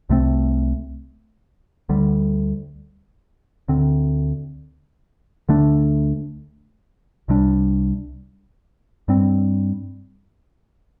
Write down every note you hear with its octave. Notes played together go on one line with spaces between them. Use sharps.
C2 C3 A3 C4
D2 D3 G3
D2 D3 C4
D2 D3 A3 D4
C2 C3 G3 D4
G2 G3 C4